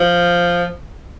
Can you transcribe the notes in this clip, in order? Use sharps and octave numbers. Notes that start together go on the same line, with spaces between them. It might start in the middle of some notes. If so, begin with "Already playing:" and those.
Already playing: F3